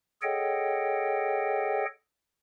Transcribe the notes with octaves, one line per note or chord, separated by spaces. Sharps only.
G#4 A4 C#5 D#5 F#5 G5